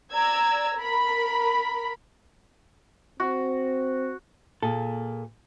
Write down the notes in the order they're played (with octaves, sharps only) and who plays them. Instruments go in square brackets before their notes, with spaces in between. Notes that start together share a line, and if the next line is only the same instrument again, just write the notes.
[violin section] D5 A#5 E6 G#6
A#4 B5
[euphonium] C4 [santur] F#4
[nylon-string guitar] A#2 A#3 [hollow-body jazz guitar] G#4 A4